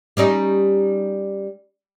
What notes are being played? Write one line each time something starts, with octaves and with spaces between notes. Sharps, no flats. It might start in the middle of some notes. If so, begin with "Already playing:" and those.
G3 C#4 D#4